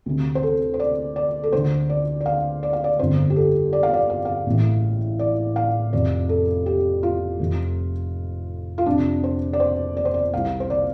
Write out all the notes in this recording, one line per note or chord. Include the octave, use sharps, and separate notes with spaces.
D2 C3
C5
A4
C5
D5
D5
A4
D2 D3 C5
D5
D5
F5
D5
F5
D5
G1 F2 D3 C5
G4
A4
D5
F5
D5
F5
F5
A1 A2
D5
F5
F1 F2 C3 D5
A4
G4
F4
F1 F2 C3
F4
F1 F2 C3 D4
C5
D5
C5
D5
C5
D5
C2 C3 F5
C5
D5